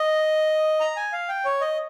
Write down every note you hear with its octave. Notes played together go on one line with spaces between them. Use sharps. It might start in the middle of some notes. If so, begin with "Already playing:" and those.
Already playing: D#5
A#5
G#5
F5
G5
C#5
D#5